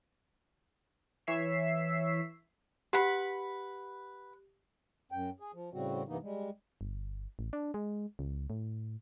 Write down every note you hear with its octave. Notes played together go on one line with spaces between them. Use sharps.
E3 C#5 E5 E6 B6 C7
G4 B4 F#5 B5
F#2 G5
G#4
F3
A2 C#3 G3 C4 F#4
G2 C3 E3 A#3 B3 D#4
G3 G#3
G1
A1
D4
G#3
C#2
A2